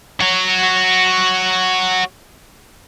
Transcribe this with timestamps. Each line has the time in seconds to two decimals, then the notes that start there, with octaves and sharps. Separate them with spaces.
0.21 F#4 C#5